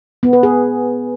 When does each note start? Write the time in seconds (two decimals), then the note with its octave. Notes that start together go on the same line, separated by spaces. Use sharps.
0.23 B3
0.33 B4
0.43 G#4